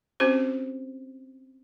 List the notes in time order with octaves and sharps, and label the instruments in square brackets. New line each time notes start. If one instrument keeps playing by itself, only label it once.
[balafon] C4 C#4 F#4 G4 C5